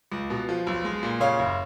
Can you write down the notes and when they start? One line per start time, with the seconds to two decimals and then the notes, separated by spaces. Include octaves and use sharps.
0.12 C#2
0.30 B2
0.49 F3
0.67 B1
0.85 G#3
1.03 A#2
1.20 C#3 C#5 F5
1.39 F#1